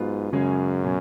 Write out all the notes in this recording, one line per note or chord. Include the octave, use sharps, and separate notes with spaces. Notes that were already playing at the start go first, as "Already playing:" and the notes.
Already playing: G#2 F#3 B3 F4
F#2 C#3 G#3 C#4 G#4
B2 F#3 C#4